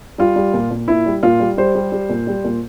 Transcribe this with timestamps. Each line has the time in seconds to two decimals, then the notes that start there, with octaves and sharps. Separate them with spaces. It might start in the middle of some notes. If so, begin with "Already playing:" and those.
0.18 G3 F4
0.36 G3
0.54 A#2
0.71 A#2
0.88 A#2 E4
1.06 G3
1.23 A#2 F4
1.40 G3
1.58 G3 C5
1.75 G3
1.92 G3
2.09 A#2
2.27 G3
2.44 A#2